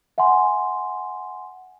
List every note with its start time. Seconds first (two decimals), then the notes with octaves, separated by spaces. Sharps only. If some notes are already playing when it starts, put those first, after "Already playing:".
0.18 E5 F#5 G#5 C6